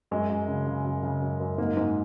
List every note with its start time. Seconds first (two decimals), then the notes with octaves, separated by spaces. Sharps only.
0.11 F#2 G#3
0.29 F#2
0.48 C#3
0.67 C#3
0.85 F#2
1.03 C#3
1.21 F#2
1.40 F#2
1.58 G#2 A#3
1.77 G#2